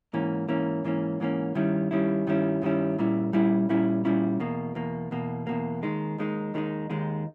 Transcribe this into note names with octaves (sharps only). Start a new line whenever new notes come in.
G#2 E3 A#3 C#4
G#2 E3 A#3 C#4
G#2 E3 A#3 C#4
G#2 E3 A#3 C#4
G2 D#3 G3 C#4 E4
G2 D#3 G3 C#4 E4
G2 D#3 G3 C#4 E4
G2 D#3 G3 C#4 E4
A#2 G3 C#4 E4
A#2 G3 C#4 E4
A#2 G3 C#4 E4
A#2 G3 C#4 E4
E2 B2 A#3
E2 B2 A#3
E2 B2 A#3
E2 B2 A#3
D#2 D#3 G#3 D#4
D#2 D#3 G#3 D#4
D#2 D#3 G#3 D#4
D#2 D#3 G#3 D#4